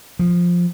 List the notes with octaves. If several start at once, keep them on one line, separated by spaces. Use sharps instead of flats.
F3